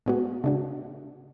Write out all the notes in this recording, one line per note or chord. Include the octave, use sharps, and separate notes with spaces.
A2 G#3 B3 F#4
C#3 G#3 D4 F#4